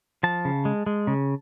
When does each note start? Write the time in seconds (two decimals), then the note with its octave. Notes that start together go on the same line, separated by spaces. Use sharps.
0.23 F3 A5
0.45 C#3
0.65 G#3
0.86 G#3
1.07 C#3